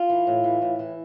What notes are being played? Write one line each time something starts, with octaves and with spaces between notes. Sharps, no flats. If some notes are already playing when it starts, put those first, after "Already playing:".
Already playing: F4
E3
A2
E3
A2
E3